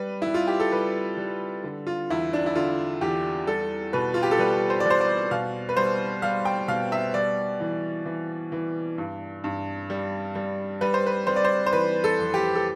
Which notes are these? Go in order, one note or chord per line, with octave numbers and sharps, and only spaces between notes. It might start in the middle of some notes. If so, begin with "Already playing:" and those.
Already playing: G3 B4
G3 E4
F4
G4
A4
G3 B4
G3
D3
F4
E2 E4
D4
E4
D3 F4
E2 G4
G3 A4
B2 B4
F4
G4
A4
G3 B4
C5
D5
G3 C5
D5
B2 F5
B4
G3 C5
G3 F5
G5
B2 F5
E5
G3 D5
E3
E3
E3
G2
G2
G3
G3
G3 B4
C5
B4
G3 C5
D5
C5
C5
E3 B4
A4
F2
G4
A4